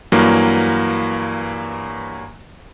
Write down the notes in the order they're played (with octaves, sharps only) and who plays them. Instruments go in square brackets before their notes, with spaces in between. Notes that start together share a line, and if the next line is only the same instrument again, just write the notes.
[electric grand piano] G2 E3 F#3 A#3